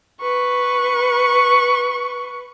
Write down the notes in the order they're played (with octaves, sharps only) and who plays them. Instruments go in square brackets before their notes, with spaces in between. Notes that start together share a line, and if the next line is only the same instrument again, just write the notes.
[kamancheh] B4 C#6